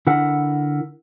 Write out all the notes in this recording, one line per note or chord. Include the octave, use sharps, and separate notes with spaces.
D3 E4 A#4 F#5